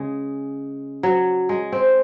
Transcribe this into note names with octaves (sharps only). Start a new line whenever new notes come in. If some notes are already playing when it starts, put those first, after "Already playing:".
Already playing: C#3 G#3
F#3
G#3
C4